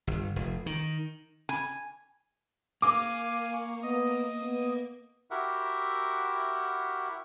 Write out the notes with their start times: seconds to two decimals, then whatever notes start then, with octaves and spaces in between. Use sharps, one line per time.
0.07 G1
0.36 F1
0.66 D#3
1.49 G#5
2.82 A#3 F5 G#5 D6
3.53 C#6
3.83 B3 D#5 D#6
4.43 B3
5.31 E4 F#4 G4 A#4 E5 F#5